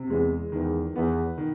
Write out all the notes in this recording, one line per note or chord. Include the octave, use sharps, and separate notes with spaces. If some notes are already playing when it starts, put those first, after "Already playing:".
Already playing: C3
E2 G#3
E2 D#3
E2 B3
D#3